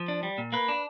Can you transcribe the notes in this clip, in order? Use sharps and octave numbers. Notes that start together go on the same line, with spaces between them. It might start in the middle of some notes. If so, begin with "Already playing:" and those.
Already playing: F3
D4
G3
A#2
A#3 B4
D4